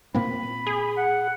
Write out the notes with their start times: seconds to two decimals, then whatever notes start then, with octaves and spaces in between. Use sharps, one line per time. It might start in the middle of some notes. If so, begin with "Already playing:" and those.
0.14 A#2 A#3 C4 B5
0.67 G#4
0.96 F#5